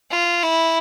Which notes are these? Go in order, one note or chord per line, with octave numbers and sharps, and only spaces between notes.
F4
E4